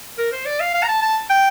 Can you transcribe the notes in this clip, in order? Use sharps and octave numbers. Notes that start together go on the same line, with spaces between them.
A#4
C5
D5
F5
F5
A#5
A5
A5
G5